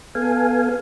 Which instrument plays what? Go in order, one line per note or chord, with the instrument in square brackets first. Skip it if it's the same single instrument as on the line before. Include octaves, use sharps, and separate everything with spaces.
[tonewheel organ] B3 A4 F5 G#5